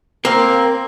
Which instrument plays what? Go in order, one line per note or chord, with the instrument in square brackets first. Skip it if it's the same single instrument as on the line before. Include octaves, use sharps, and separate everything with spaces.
[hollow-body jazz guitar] A#3 [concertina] C4 [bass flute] A#4